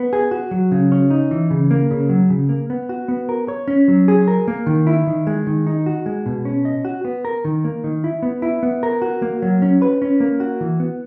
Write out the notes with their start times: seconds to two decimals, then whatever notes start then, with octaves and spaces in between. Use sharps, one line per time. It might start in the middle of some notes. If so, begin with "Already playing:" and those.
Already playing: B3
0.13 G#4
0.31 F#4
0.51 F#3
0.71 C#3
0.92 C#4
1.10 D#4
1.31 E3
1.51 C#3
1.71 A#3
1.91 C#3
2.09 F#3
2.30 C#3
2.49 A#3
2.70 B3
2.89 F#4
3.08 B3
3.29 A#4
3.48 C#5
3.68 C#4
3.88 F#3
4.08 G#4
4.28 A#4
4.48 A#3
4.66 D#3
4.87 E4
5.07 D#3
5.27 G#3
5.47 D#3
5.67 D#4
5.86 F#4
6.06 G#3
6.26 B2
6.45 C#4
6.65 D#5
6.85 F#4
7.05 B3
7.25 A#4
7.45 D#3
7.64 A#3
7.84 D#3
8.04 E4
8.23 B3
8.42 E4
8.63 B3
8.83 A#4
9.02 F#4
9.22 A#3
9.42 F#3
9.62 C#4
9.82 B4
10.02 C#4
10.20 A#3
10.40 F#4
10.61 E3
10.80 B3